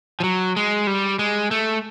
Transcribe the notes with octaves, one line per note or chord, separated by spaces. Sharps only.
F3
F#3
G#3
G3
G#3
A3